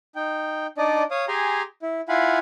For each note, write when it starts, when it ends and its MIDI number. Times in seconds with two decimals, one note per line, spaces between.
0.16 0.67 63
0.16 0.67 79
0.78 1.03 62
0.78 1.03 63
0.78 1.03 74
0.78 1.03 75
1.11 1.25 73
1.11 1.25 77
1.11 1.25 87
1.28 1.62 67
1.28 1.62 68
1.28 1.62 80
1.28 1.62 82
1.28 1.62 84
1.82 2.01 64
2.09 2.39 64
2.09 2.39 65
2.09 2.39 77
2.09 2.39 78
2.09 2.39 80
2.09 2.39 83